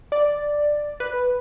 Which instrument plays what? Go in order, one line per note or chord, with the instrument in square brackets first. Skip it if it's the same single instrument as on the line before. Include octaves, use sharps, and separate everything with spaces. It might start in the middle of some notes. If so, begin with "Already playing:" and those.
[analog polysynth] D5
B4